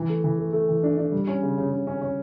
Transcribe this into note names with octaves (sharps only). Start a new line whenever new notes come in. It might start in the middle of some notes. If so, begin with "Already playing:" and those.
Already playing: E3
A3
E3
A3
A3
E3
D4
D4
G3
C#4
C#3
C#3
C#3
C#4
C#4